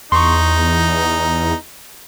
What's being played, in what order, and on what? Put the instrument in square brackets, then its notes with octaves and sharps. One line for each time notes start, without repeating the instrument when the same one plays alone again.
[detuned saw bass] E2 [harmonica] D#4 [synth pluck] C6 C#6